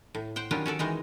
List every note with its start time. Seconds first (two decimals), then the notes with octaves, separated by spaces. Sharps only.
0.15 A2
0.36 C5 F#5 G5
0.51 D#3 F#3 G3 C#4 D4 F4
0.66 C#4 F#4 A4 D5
0.79 D#3 E3 G#3 D#4